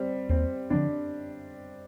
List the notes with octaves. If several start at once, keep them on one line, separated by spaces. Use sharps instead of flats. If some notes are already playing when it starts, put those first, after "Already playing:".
Already playing: G3 C4
D#2 C4
D3 F3 C4 D4